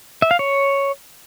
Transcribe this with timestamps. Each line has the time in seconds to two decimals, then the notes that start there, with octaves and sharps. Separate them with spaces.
0.22 E5
0.31 F5
0.39 C#5